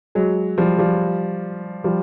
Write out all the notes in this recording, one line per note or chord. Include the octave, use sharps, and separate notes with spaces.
F#3 G#3
F3 G3
F3 G3
F3 G3